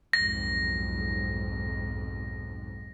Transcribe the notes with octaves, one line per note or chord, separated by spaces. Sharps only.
B1 F2 G#2 A#6